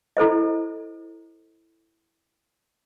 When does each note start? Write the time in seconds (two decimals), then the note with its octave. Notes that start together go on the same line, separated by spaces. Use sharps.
0.17 E4 A4 C5 D#5